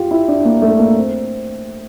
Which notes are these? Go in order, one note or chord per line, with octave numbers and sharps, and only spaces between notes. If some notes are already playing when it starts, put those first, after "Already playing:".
Already playing: F4 G4
E4
D4
A#3
A3
A#3
C4